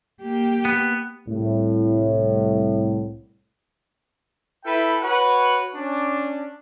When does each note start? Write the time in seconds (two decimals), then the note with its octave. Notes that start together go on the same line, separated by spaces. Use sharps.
0.22 A#3 G4
0.65 B3
1.27 C2 A2
4.64 E4 A4 B4 E5 G5
5.02 F#4 B4 C#5 F#5
5.73 C#4 D4